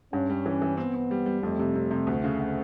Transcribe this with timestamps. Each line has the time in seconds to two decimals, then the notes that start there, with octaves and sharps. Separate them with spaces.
0.13 G2 C#4
0.30 G3
0.46 E3
0.62 E3
0.77 B3 C4
0.94 C4
1.11 G3
1.26 G3
1.43 F2 A3
1.59 C3
1.75 C3
1.91 C3
2.07 D2
2.24 C#3
2.40 C#3